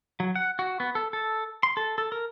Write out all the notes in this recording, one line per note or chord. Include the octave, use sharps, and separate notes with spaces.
F#3
F#5
F#4
B3
A4
A4
C6
A4
A4
A#4